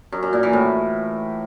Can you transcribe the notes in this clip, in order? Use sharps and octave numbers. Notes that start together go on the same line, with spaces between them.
F#2
F#2
A#2
E3
A2